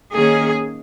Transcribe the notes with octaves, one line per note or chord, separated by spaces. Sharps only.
D#3 A#3 C#4 G#4